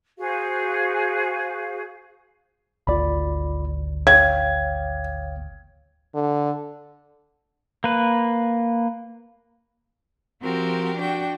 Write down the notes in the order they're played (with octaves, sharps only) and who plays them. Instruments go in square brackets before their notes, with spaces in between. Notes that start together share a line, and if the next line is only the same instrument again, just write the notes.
[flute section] F#4 G#4 C5 F5
[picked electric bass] G#1 D2 [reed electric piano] F4 D5 B5
[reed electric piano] C#5 F5 G5 [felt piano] G#6
[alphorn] D3
[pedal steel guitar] A#3 B4
[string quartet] F3 C4 F#4 G4 A#4
D4 F#4 G5